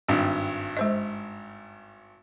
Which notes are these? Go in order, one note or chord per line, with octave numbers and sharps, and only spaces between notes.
G#1 G2
G#3 C5 D#5